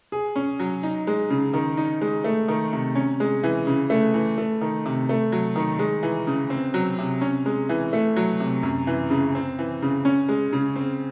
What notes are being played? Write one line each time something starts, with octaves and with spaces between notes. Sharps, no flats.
G#4
C#4
F#3
D#4
G#3
C#3
D#3
D#4
G#3
A3
D#3
C3
C#4
G#3
E3
C#3
A3
E3
A3
D#3
C3
A3
F#3
D#3
G#3
E3
C#3
C4
F#3
C3
C#4
G#3
E3
A3
F#3
C3
F#2
E3
C#3
C4
E3
C#3
C#4
G#3
C#3
C4